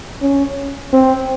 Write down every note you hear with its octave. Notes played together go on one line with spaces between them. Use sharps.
C#4
C4